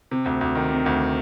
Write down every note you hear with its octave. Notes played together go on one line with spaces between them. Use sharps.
C3
D2
D2
D#3
C3
D2